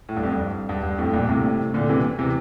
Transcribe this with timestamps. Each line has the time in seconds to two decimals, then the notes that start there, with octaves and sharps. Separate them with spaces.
0.09 A2
0.16 G2
0.23 F2
0.31 G2
0.69 G2
0.83 G2
0.98 F2 A2
1.13 G2 A#2
1.28 A2 C3
1.74 A#2 D3
1.89 C3 E3
2.19 C3 E3